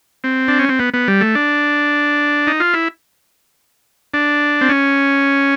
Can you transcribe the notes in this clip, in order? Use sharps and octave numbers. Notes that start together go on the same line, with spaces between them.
C4
D4
C#4
C4
B3
B3
G3
A3
D4
D#4
F4
E4
D4
C4
C#4